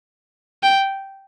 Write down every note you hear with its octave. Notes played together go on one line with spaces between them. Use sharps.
G5